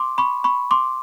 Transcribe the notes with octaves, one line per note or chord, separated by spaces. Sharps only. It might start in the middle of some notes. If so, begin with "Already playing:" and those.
Already playing: C6 D6
B5 C#6
B5 C#6
C6 D6